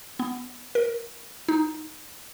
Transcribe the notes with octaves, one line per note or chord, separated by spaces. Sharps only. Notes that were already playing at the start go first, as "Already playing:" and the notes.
B3
A#4
D#4